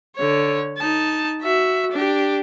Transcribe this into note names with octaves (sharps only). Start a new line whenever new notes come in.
D3 C#5
D#4 A5
F#4 E5
D4 G4